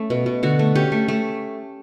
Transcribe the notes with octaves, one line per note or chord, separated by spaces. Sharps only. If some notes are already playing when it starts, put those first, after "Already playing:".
Already playing: A3 C#4
B2
B2
D3 F#4
A3
C#4 G4
A3
A3